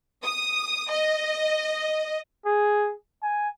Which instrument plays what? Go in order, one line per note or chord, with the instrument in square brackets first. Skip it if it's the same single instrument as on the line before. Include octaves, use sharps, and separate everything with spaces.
[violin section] D#6
D#5
[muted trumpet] G#4
G#5